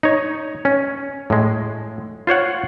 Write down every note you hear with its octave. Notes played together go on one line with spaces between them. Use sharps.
D#4 C#5
C#4
A2 G#3
F4 C5 C#5 F#5